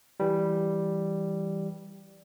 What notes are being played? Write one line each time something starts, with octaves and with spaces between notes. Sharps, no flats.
E3 G3